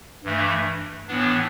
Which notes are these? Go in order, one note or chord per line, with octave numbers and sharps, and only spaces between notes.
G2 E3 A3
A2 E3 B3 D4